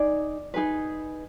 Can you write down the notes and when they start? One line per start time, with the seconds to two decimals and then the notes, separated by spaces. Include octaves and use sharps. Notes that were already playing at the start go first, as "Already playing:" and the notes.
Already playing: D#4 G#4 D5
0.54 D#4 G#4 B4